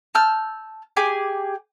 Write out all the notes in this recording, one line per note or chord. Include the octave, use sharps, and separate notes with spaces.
A5 E6 F6 G6
G4 G#4 G#5 D6